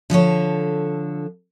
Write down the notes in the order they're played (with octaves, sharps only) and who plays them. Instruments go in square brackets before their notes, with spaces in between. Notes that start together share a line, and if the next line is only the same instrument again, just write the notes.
[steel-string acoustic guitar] D3 F3 A4 C#5